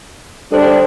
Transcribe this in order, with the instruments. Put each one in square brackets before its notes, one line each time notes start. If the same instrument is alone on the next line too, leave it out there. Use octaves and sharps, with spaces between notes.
[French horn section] D3 G3 D4 [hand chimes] A4 C5